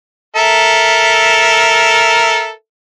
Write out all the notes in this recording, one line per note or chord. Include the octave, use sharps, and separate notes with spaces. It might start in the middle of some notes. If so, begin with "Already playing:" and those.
A4 A#4 E5